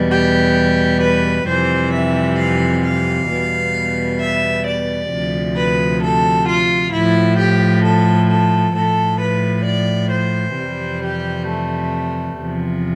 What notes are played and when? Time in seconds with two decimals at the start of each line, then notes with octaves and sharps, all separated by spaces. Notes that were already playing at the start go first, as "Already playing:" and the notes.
Already playing: E2 B2 G3
0.12 G4
1.02 B4
1.47 F2 C3 E3 G3 C5
1.94 E5
2.39 F5
2.85 F5
3.29 E2 B2 G3
4.21 E5
4.66 D5
5.11 D2 C3 F3
5.56 B4
6.03 A4
6.48 F4
6.93 A2 F3 E4
7.39 G4
7.84 A4
8.29 A4
8.76 A2 F3 A4
9.21 B4
9.66 D5
10.12 C5
10.57 F2 C3 E3 G3
11.03 G4
11.48 A3
12.39 E2 C3 F3